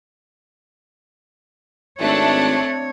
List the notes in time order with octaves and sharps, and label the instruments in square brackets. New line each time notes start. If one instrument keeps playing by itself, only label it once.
[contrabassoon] G#1 [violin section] A3 F#6 [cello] C4 C#5 [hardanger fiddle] D4